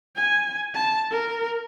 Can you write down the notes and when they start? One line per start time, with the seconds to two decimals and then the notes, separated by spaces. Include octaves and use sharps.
0.16 G#5
0.74 A5
1.11 A#4